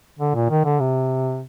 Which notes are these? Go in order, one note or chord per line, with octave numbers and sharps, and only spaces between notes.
D3
A#2
D#3
D3
C3